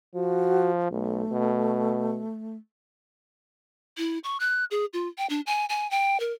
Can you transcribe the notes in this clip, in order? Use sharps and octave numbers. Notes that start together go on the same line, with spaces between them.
F3 F#4
B1 A3
B2
E4
C#6
F#6
G#4
F4
G5
D4
G#5
G#5
G5
A#4